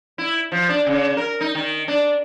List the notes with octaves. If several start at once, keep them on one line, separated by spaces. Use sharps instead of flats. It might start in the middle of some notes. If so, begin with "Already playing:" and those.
E4
F3
D4
C#3
A#4
D#4
D#3
D4